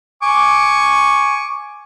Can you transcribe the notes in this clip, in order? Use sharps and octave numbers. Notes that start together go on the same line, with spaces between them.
G#5 C#6 D6